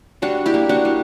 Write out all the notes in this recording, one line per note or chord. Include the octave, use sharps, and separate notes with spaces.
G3 D4 F#4
E4 G4
A#3
D4 F#4
G3